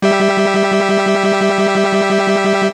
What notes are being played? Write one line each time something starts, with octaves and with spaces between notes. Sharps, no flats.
G3 G4 E5